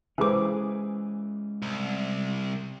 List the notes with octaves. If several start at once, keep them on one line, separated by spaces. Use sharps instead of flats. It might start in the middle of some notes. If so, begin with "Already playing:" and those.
E3 G#3 C#4 G#4 A4 C5 D6
C2